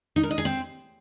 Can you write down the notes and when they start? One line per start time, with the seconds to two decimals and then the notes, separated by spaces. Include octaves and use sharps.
0.16 D#4
0.23 A#4
0.31 D#5
0.38 G#4
0.45 C4